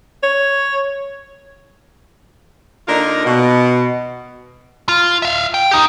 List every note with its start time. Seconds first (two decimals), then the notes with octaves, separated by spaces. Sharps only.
0.23 C#5
2.88 D3 A#3 D4 D#4 F4 A#4
3.25 B2
4.89 F4
5.22 E5 F5
5.54 G5
5.71 D#4 G4